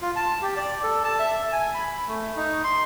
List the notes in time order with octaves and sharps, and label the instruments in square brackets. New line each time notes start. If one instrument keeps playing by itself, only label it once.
[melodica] F4
A5
G4
D5
A4
A5
E5
G#5
B5
A3
D#4
C6